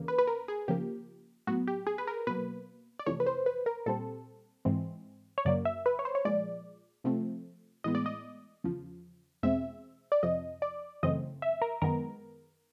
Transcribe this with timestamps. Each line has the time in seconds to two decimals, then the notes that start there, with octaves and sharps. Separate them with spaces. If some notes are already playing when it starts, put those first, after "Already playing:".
Already playing: E2 C#3 A#3
0.08 B4
0.18 B4
0.27 A#4
0.48 G#4
0.68 C#3 F3 A#3 G4
1.47 A2 F#3 B3 F#4
1.67 G4
1.87 G#4
1.98 B4
2.07 A#4
2.27 B2 F#3 A#3 B4
2.99 D5
3.06 F2 C3 E3 A3 C#5
3.20 B4
3.26 C5
3.46 B4
3.66 A#4
3.86 A#2 G3 C4 A4
4.65 G#2 E3 G#3 C4
5.38 C#5
5.45 F#2 C#3 F#3 A#3 D5
5.65 E5
5.86 B4
5.99 C#5
6.05 C5
6.15 C#5
6.25 A#2 F3 G#3 D5
7.04 C3 F3 A3 C4
7.84 A2 E3 G#3 B3 D#5
7.95 D5
8.06 D#5
8.64 E2 C#3 F3
9.43 E2 B2 G#3 C4 E5
10.12 D5
10.23 F2 C3 F3 D#5
10.62 D5
11.03 F#2 C#3 E3 A3 C4 D#5
11.42 E5
11.62 A#4
11.82 F#2 D#3 G#3 B3 A#4